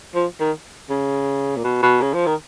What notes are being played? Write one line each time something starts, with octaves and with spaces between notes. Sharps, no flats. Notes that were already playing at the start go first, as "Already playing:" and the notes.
F3
D#3
C#3
A#2
B2
B2
C#3
F3
D#3